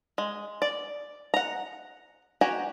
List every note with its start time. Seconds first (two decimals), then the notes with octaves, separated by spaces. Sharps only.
0.18 G#3
0.62 D5
1.34 F#5 A#5
2.41 F#4 G4 G#5 A#5